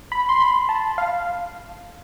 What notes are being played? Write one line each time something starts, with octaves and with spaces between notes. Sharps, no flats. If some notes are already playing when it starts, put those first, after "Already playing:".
B5
C6
B5
A5
F5